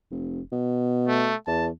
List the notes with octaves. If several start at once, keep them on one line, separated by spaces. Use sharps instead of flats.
F1
B2
A3
E2 A5